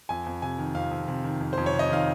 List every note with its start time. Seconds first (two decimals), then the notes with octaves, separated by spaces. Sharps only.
0.09 F2 G#5
0.26 F2
0.42 C3 G#5
0.58 D#3
0.75 F2 F5
0.91 F2
1.08 C3
1.24 D#3
1.40 F2
1.53 F2 C5
1.66 C#5
1.73 C3
1.79 D#5
1.90 D#3 F5